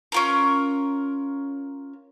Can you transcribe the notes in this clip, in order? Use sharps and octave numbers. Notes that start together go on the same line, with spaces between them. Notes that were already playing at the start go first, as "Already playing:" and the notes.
C#4 F4 A#4